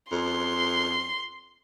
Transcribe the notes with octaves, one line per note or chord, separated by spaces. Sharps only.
F2 C6